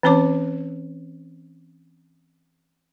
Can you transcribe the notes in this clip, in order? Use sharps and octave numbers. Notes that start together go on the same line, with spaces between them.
E3 C4 C#4 C#5 D6